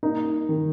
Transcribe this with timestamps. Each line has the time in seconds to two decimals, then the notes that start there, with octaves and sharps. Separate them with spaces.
0.03 A#3 D#4
0.49 D#3